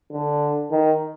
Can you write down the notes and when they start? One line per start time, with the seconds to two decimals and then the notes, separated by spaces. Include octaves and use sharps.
0.12 D3
0.71 D#3